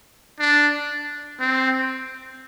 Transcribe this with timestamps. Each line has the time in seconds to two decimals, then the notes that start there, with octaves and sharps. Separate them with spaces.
0.40 D4
1.40 C4